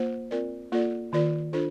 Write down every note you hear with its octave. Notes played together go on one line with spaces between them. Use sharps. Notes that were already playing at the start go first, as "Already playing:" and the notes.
Already playing: A#3 F4 C5
C4 F4 A#4 D5
A#3 F4 A4 D5
D#3 A#3 F4 A#4 D5
D4 F4 A4 C5